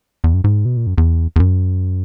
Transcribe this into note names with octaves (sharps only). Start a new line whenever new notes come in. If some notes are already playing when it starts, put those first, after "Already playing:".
E2
F#2
G#2
B2
A#2
F#2
E2
E2
F#2